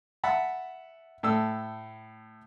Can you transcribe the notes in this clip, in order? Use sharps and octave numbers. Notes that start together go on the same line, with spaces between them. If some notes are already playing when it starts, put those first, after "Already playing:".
E5 F#5 A5 B5
A2 A4 E6